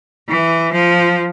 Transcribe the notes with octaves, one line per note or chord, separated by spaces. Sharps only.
E3
F3